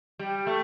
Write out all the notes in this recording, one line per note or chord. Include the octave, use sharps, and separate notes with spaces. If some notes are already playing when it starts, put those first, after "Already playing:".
G3
A3